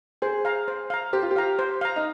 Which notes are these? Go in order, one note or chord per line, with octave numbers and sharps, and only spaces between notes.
G#4 C5
F5 A#5
C5
F5 A#5
G4 C5
F4
G4
F5 A#5
C5
F5 A#5
D#4